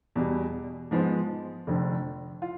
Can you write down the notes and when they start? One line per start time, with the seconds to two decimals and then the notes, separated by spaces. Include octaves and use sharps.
0.15 E2 B2 G3
0.91 G#2 F3 G#3 B3
1.67 F1 F2 D3
2.42 F4